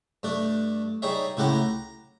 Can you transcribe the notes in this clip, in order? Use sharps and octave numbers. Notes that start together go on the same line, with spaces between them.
G2 A3 D4
G3 D#4 G#4 C#5 E5
C#2 A2 E4 G4 F#5 A#5
A#5